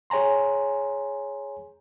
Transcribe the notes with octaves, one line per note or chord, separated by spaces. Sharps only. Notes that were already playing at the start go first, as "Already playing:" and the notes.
G#4 C#5 G#5 A#5 C6